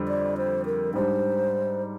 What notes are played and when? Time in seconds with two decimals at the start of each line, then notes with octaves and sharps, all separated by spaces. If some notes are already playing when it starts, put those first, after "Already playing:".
Already playing: F2 D3 G3
0.08 D5
0.37 C5
0.66 A#4
0.93 G#2 G3 D4 C5